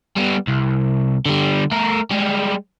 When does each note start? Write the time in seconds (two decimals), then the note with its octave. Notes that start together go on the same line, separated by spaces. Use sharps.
0.16 G3 B3
0.47 C2
1.26 D3 G3
1.71 A3 A#4
2.11 G3 G#3